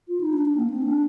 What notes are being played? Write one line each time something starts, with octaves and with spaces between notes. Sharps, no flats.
F4
D#4
D4
D4
A#3
C4
D4